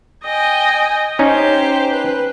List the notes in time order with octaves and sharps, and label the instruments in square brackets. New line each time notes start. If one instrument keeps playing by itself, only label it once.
[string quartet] D#5 G5 G#5
[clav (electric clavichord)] C#4 D#4 [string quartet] G4 C5
[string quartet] B4